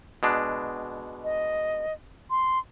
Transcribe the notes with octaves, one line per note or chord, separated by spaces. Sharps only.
B2 G#3 D4
D#5
C6